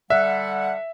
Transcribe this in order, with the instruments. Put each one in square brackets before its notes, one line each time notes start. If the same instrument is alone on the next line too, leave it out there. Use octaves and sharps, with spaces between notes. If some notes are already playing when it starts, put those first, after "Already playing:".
[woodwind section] D3 G3 F#5 [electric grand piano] E5